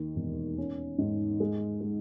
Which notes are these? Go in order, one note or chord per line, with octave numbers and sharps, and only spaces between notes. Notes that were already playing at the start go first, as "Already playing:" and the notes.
Already playing: D#2
E1
C#4
G#2
G#3
G#3